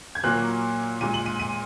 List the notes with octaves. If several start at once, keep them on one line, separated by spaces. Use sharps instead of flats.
G#6
A#2 F#3 A#3 F#6
A#2 G#3 D#7
F#7
D#7
D#7